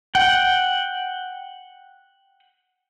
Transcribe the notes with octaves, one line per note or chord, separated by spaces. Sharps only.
F#5 G5